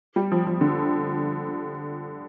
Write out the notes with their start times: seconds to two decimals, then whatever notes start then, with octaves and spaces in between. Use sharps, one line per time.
0.16 G3
0.32 F3
0.47 F3
0.61 D3